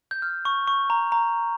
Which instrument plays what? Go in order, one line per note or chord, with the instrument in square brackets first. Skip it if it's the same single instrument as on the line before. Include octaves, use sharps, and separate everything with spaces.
[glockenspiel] G6
F6
C#6
C#6
A#5
A#5